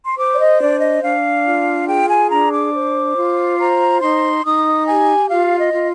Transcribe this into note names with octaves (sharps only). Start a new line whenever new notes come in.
C6
C5 D6
D5
D#5
D4 D5
D#5
D4 F5
F4
G#4 G5
G#5
D4 A#5
D6
C5
F4
C5 A#5
D#4 C6
D#4 D#6
G4 G#5
F4 F5
D#5
F4